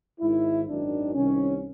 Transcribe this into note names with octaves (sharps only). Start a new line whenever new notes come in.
G#1 G#2 D#3 E4
G#1 F#2 D#3 D4
C2 C3 D#3 C#4